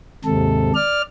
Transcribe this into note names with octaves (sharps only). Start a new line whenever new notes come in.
D#2 G#2 C3 A4
D5 F6